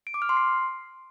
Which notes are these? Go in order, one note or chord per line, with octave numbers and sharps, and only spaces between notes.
D7
D6
F6
C6
C7